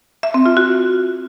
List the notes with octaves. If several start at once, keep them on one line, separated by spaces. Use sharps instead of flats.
E5
C4
F4
F#4